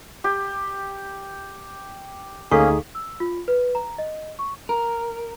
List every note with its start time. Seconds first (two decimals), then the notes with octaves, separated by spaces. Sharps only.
0.24 G4
2.51 D2 A#3 C#4 D#4 G#4 A4 F5 C#6
2.95 E6
3.20 F4
3.48 B4
3.75 A#5
3.98 D#5
4.39 C#6
4.69 A#4